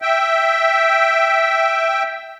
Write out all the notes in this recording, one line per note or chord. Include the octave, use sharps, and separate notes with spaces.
E5 G5